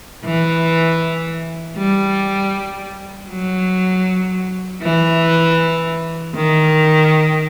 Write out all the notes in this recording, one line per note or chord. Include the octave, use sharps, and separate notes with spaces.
E3
G3
F#3
E3
D#3